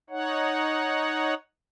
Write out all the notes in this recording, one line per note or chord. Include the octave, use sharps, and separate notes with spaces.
D#4 C#5 F#5